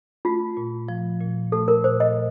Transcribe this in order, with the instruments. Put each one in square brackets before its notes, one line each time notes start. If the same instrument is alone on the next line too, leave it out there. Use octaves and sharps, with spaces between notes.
[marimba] A3 [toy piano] F4
[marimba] A#2
F3
A#2
[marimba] A3 [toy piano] A4
[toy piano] A#4
[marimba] A#2 [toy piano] C5
[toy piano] D#5